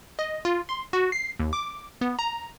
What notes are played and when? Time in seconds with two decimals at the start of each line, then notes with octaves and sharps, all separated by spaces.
0.19 D#5
0.45 F4
0.69 C6
0.93 F#4
1.12 C7
1.40 D#2
1.53 D6
2.01 B3
2.19 A#5